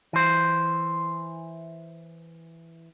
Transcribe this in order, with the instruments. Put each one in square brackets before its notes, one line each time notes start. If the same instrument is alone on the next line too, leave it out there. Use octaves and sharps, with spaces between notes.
[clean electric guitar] E3 C5